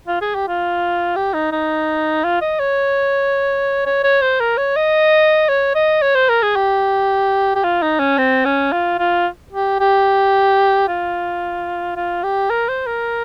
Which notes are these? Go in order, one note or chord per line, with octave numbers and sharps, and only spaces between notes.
F4
G#4
G4
F4
G4
D#4
D#4
F4
D#5
C#5
C#5
C#5
C5
A#4
C#5
D#5
C#5
D#5
C#5
C5
A#4
G#4
G4
G4
F4
D#4
C#4
C4
C#4
F4
F4
G4
G4
F4
F4
G4
A#4
C5
A#4